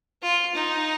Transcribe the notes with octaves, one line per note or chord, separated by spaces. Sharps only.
F4
D#4